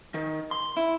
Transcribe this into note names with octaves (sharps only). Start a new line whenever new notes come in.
D#3
C6
E4